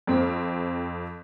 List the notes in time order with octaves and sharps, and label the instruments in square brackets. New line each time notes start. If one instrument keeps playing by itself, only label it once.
[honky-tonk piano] F2 C4